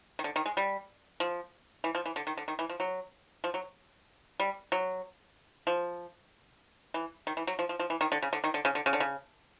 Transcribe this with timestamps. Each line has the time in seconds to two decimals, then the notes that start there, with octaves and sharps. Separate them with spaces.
0.19 D#3
0.24 D3
0.36 D#3
0.46 G#3
0.57 G3
1.20 F3
1.84 E3
1.95 F3
2.06 E3
2.16 D3
2.27 D#3
2.37 D3
2.48 D#3
2.59 E3
2.69 F3
2.80 F#3
3.44 F3
3.54 F#3
4.40 G3
4.72 F#3
5.67 F3
6.94 E3
7.27 D#3
7.37 E3
7.47 F#3
7.59 F3
7.69 F3
7.79 F3
7.90 E3
8.01 D#3
8.12 D3
8.22 C#3
8.33 D3
8.44 D#3
8.54 D3
8.65 C#3
8.75 D3
8.86 C#3
8.93 D3
9.00 C#3